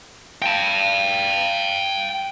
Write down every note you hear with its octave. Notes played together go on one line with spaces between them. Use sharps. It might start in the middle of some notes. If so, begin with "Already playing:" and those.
G5 A5